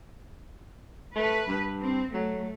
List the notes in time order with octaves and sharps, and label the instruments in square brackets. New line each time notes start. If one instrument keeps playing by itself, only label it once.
[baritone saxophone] A3 [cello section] B4
[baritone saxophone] G2
[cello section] C4
[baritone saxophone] F#3 [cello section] A3